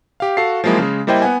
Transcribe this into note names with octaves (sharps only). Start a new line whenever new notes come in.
G4 F5
F#4 A4 F5 C7
F3 F#3 G#3 A#3 E4
C#3 G#3
G3 A#3 E4 C5 D#5 G5
B3 F#5 G#5